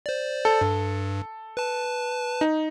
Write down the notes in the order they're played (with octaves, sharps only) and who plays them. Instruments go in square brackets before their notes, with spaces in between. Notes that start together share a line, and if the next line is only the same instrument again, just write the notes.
[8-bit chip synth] C5 D5
[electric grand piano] A4
[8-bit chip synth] G2
B4 A5
[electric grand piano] D#4